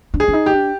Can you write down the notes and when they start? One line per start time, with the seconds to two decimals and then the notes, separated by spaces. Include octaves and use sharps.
0.14 D4
0.20 G#4
0.28 D4
0.33 D#4
0.46 G4
0.53 D4